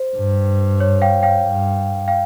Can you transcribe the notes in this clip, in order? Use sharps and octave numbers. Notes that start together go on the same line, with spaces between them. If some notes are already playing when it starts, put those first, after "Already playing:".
Already playing: C5
G2
C#5
F5 G5
F5 G5
G2
F5 G5